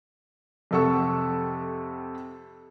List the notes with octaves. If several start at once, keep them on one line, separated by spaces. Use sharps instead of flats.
F2 C3 A4 F#5 C#6 E6